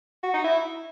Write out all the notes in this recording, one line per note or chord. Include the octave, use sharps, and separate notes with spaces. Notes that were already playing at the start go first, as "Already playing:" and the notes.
F#4
D#4
E4